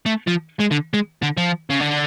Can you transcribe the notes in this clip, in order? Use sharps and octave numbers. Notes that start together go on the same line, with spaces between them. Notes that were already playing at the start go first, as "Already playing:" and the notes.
A3
F3
G#3
D3
G#3
D3
F3
C#3
D3